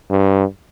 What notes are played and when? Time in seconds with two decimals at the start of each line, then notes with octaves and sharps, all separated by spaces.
0.10 G2